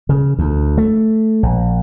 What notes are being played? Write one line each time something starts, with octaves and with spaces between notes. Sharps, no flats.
C#3
D2
A3
A#1